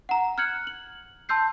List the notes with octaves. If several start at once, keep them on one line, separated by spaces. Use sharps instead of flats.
F#5 A#5
F6 F#6 G#6 C#7 F#7
F#7
A5 C6 E6 G6 C7